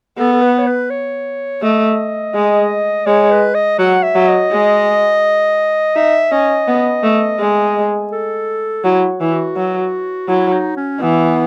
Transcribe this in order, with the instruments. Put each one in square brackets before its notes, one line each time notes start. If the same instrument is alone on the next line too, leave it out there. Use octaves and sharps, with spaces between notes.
[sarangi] B3 [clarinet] A4
[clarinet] A4
B4
C#5
B4
C#5
[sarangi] A3 [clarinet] D#5
[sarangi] G#3
[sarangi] G#3 [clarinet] C#5
[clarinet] B4
D#5
[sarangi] F#3 [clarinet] F#5
[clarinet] E5
[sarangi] F#3
[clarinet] D#5
[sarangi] G#3
[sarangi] D#4 [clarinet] E5
[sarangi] C#4 [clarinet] D#5
[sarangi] B3
A3
G#3
[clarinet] A4
[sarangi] F#3 [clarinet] E4
[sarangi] E3 [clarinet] E4
[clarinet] F#4
[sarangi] F#3
[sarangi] F#3 [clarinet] E4
[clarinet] D#4
C#4
[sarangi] E3 [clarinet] B3